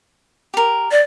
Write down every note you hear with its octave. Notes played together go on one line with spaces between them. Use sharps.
G4 A#4
D5